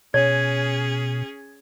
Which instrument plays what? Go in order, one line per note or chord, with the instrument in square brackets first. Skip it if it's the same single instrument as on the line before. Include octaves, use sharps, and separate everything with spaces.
[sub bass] B2 [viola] C#4 G#4 [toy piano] C#5 [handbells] G#6